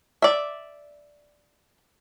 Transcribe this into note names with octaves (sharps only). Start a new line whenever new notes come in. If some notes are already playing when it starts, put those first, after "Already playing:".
D5 E5